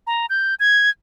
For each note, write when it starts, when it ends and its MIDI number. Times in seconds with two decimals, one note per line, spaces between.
0.07 0.26 82
0.29 0.54 91
0.60 0.90 92